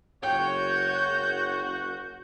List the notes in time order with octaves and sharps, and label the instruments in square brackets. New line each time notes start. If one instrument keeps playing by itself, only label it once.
[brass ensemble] F#1 F#4 [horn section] C#5 [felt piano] G5 [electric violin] G6